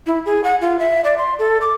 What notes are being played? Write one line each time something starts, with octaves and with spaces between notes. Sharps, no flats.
E4
G#4
F#5
F4
E5
D5
C6
A4
D6